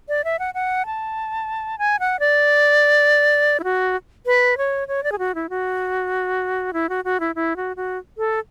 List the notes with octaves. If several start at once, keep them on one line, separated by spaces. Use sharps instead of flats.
D5
E5
F#5
F#5
A5
G#5
F#5
D5
E4
F#4
B4
C#5
C#5
D5
G#4
F#4
E4
F#4
E4
F#4
F#4
E4
E4
F#4
F#4
A4